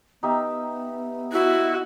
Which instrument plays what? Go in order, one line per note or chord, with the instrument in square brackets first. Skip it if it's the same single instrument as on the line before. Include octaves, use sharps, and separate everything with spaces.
[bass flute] B3 [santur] D#4 G4 E5
[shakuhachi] E4 [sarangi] F#4